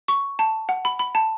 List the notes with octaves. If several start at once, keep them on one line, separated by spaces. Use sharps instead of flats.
C#6
A5
F#5
B5
B5
A5